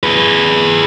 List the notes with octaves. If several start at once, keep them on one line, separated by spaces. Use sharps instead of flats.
G#4 B4